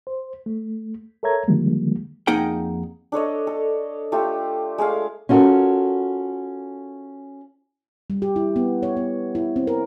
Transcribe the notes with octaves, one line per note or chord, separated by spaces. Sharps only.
C5
A3
A4 A#4 C#5 E5 A#5 G#6
D3 D#3 F3 G3 G#3 A#3
F2 A#3 D#4 G#4 F#5 G5
D4 A4 C#5 D#5
A4
A3 F4 G4
G#3 A3 G#4 F5
C#4 F4 F#4 A4 A#4
G3
G4
E4
B3
C#5
B3
E4
C4
A#4